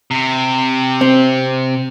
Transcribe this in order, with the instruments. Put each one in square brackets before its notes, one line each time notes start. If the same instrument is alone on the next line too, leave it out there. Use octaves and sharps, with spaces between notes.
[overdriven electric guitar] C3
[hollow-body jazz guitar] C4